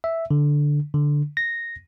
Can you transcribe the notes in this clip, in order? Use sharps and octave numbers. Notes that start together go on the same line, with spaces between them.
E5
D3
D3
A#6